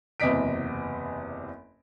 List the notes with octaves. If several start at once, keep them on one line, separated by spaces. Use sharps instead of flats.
F#1 E2 C3 D#5 B6 D7